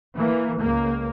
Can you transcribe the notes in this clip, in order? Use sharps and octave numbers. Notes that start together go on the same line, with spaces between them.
E3 A#3
C#2 A#3